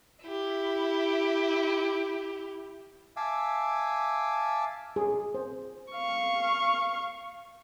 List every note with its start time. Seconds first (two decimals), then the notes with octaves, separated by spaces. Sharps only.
0.24 E4 G4
3.17 E5 F5 G#5 A5 D6 E6
4.96 G#4
5.35 C5
5.92 F5 C#6